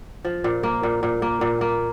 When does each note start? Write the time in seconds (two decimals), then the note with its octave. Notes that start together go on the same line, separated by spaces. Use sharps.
0.25 F3
0.44 A#2
0.63 A#3
0.83 A#2
1.03 A#2
1.22 A#3
1.41 A#2
1.61 A#3